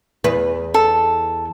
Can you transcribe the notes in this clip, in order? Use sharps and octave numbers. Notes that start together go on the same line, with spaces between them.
E2 B4
A4